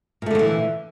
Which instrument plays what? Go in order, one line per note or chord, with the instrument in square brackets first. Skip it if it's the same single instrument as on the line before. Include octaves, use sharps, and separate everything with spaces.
[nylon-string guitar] A#2
A3
D3
F#3
E3